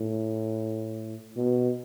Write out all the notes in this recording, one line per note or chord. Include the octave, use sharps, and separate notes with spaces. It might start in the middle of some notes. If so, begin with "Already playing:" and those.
Already playing: A2
B2